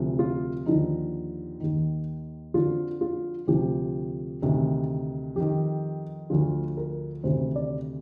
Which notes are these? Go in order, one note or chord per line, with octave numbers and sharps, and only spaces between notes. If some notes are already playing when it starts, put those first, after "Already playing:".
Already playing: D2 C3 F3
F4
D#2 D3 F3 D#4
D#2 D#3
F2 D3 F3 F4
F4
D2 C3 F3 G4
D2 C3 D#3
F2 D#3 G4
D2 D3 F3 F4
A#4
D2 C3 D#3 C5
D5